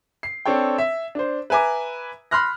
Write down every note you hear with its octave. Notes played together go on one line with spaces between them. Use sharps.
C7
C4 D4 A4 C#5 G5
E5
D4 C5
B4 E5 G#5 A#5 D6
B5 C6 F6 F#6 A#6